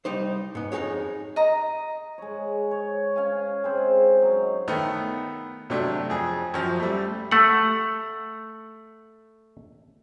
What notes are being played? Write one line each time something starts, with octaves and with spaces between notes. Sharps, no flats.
C2 G3 D#4 C5
G#2 B3
F2 D#4 G4 G#4 C#5
D#5 A#5
G#3 C#5
C#5
C#4 F5 G#5
G#3 C4 C5
F#3 D#4
D#3 A3 B3
C3 F#3 A3 D4
F2 G#4
F#2 F3
G3 A3
A3 F#5